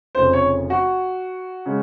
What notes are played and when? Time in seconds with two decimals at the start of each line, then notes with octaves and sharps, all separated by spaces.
0.15 F1 F2 C#3 C5
0.33 C#5
0.70 F#4
1.66 C#3 G#3